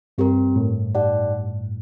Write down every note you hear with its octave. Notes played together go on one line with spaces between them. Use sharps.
G2 C4 G4 A#4
A2
D#4 G4 D5 F#5 A5